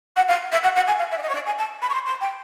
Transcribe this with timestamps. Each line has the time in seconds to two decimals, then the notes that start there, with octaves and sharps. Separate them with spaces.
0.16 F#5
0.28 F5
0.51 E5
0.63 F#5
0.75 F#5
0.87 G#5
0.98 F5
1.10 E5
1.17 D5
1.22 D#5
1.28 C#5
1.34 D5
1.46 G#5
1.58 A5
1.81 B5
1.89 C#6
1.93 C6
2.05 C6
2.21 G5